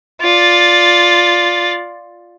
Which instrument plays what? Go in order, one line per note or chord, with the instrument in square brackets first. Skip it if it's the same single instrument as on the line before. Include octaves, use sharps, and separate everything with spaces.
[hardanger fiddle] F4 D5